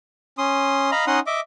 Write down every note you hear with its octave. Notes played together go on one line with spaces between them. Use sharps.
C#4 C6 D#6
D#5 F5 A#5 B5
C#4 D#4 D#5 F#5 C6 D#6
D#5 E5 D6